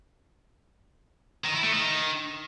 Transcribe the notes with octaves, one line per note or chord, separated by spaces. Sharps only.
D#3
E4
A3
D#3